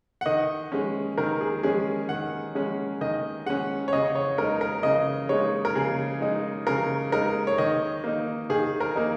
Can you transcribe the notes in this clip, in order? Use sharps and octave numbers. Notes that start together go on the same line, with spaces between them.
F#5
D#3 D#5
G#3 C#4
D#3 A#4
G#4
G#3 C#4 G#4
D#3 F#5
G#3 C#4
D#3 D#5
G#3 C#4 F#5
C#5
C#3 D#5
C#5
G#3 D#4 A#4
A#4
C#3 D#5
G#3 D#4 C#5
A#4
C#3 G#4
G#3 D#4
C#3 A#4
G#3 D#4 A#4
C#5
D#3 D#5
A#3 D#4
D#3 G#4
A#4
A#3 D#4